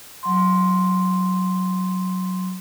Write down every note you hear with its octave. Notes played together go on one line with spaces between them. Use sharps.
F#3 C6